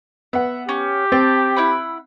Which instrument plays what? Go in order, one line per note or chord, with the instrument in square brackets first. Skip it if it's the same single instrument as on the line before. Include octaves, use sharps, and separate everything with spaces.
[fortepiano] B3 F#5 [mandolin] E5
[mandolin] C#4 [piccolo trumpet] G4
[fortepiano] C4 [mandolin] G5 A5
[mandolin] E4 F#5 B5